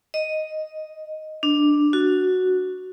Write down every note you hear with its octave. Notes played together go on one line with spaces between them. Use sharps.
D#5
D4
F#4